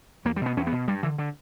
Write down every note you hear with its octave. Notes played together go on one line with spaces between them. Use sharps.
E2 A#3
G3
B2 B3
E2 C#4
B3
B2
G2 G3
D3 E3
D3